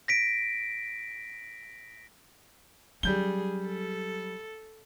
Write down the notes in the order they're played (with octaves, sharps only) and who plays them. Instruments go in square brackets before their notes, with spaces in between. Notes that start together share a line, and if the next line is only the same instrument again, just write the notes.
[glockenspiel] A#6 B6 D7
[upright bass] F#3 C#4 [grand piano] G3 G6 G7 [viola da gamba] G#4
[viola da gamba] A4